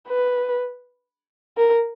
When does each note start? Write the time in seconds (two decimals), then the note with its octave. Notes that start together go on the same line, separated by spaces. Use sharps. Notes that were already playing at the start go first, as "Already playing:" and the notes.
0.09 B4
1.58 A#4